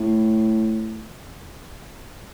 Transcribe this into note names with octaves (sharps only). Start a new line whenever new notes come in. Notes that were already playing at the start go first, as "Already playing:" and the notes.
Already playing: A2